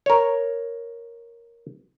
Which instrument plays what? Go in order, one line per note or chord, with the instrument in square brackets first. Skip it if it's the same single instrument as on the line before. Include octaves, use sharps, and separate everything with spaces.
[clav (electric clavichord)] A#4 C#5